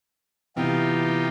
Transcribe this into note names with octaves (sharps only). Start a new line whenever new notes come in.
C3 E3 B3 C4 D#4 F4 G4